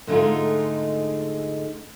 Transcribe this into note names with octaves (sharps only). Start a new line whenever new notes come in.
G#2 D3 G#3 A3 D#4 F4